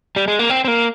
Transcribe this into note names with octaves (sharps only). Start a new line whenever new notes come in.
G3
G#3
A#3
C4
C4
A#3